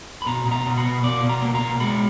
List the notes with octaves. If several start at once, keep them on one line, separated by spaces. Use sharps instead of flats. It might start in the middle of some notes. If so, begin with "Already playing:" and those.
B5
B2 A#5
B2
A#5
B2
B5
B2
B2 D5
B2
A#5
A#3
A#5
B2
G#3 B5